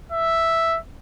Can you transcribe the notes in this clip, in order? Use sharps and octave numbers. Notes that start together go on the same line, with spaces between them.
E5